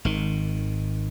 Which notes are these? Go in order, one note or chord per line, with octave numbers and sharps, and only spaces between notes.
G#1 D#3